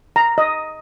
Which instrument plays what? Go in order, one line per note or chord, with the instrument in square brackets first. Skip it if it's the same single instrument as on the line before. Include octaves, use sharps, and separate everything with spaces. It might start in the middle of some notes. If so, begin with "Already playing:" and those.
[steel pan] A#5
D#5